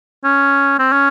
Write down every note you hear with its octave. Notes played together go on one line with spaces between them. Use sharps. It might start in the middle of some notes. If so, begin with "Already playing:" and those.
C#4
C4
C#4